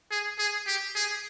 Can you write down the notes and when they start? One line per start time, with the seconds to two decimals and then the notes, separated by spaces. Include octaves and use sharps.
0.11 G#4
0.39 G#4
0.67 G4
0.95 G#4